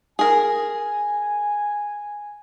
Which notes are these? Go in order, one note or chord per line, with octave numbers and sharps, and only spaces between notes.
G#4 A#4 G#5